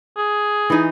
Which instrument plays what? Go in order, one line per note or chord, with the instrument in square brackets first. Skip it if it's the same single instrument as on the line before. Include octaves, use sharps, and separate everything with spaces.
[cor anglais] G#4
[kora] E3 D#4